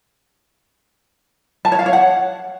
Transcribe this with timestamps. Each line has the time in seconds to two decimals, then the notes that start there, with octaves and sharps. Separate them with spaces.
1.65 A5
1.72 C#5
1.79 F5
1.86 C#5
1.93 F#5